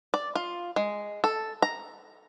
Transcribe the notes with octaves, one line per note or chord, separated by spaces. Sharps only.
D5
F4
G#3
A4
A#5